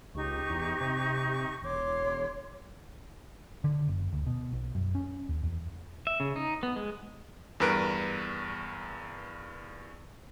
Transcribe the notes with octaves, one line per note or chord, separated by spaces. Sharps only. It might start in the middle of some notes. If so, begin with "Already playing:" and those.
C#2 D#4 G4 C#6
E2
C3
E1 C#5 C6 D6
D3
F#1
D2
B2
B1
F#2
C#4
D#2
E2
E5
C#3
D#4
B3
G#3
E2 G2 A#4 B4 A#5 D7